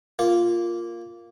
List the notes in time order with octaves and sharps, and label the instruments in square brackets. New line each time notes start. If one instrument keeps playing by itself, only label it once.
[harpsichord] A#3 F4